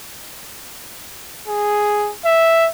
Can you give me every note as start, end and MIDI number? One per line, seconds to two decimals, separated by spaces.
1.48 2.13 68
2.25 2.69 76